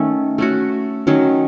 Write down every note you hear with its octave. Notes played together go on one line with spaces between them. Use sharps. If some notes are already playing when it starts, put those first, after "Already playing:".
Already playing: D#3 A3 C#4
A3 C#4 F#4
D#3 F#3 C#4